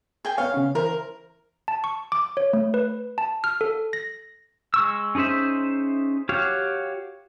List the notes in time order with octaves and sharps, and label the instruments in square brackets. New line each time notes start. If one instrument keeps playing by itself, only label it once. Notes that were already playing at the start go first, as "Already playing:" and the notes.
[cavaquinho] G#4 G5 G#5
[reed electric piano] B3 C#5 [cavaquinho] F5
[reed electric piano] C#3 C#4
[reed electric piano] E3 C5 [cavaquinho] A#4
[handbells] A5
C#6
D6
C#5
A3
B4
A5
F6
A4
A#6
[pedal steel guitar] G#3 C#6 E6
C#4 D#4 G#4 C5 E5
F#4 G4 C#5 F5